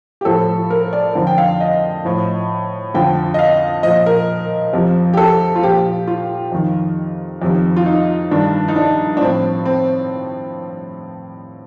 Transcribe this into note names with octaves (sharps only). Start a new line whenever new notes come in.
G4
A2 F3 A4
A#4
D5
F2 D3 F3
G5
F5
D#5
A2 F3
F2 D3 F3 G5
D#5
F5
A#2 F3 D#5
A#4
F2 C3 F3
G4
A4
F4
A#2 F3 G4
F4
F2 D#3
F2 C3 D#3
F4
D#4
G2 D#3 D4
D#4
D4
D4
A2 F3 C4
C4